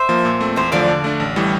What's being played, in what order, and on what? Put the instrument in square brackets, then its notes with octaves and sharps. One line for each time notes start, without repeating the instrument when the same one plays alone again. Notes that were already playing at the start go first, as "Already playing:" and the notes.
Already playing: [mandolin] C5 E5
[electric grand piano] F3 A#3
A#2
A3 C4
[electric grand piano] E2 [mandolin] C5 E5
[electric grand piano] D3 F3 A3 [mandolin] D5 F5
[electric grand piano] D3
A3 D4
A1
A2 E3 G3